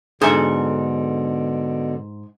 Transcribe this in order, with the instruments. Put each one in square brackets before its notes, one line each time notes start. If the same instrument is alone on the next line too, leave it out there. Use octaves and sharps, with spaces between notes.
[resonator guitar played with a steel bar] G#2 [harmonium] B2 D3 [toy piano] D4 [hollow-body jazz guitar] G#4 A4 E5